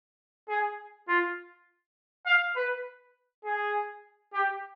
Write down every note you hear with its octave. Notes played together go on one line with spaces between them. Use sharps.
G#4
F4
F5
B4
G#4
G4